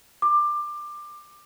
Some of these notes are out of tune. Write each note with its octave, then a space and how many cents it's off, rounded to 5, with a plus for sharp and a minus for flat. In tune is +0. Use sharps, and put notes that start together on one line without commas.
D6 +20